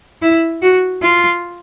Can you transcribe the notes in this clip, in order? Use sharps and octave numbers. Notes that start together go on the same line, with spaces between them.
E4
F#4
F4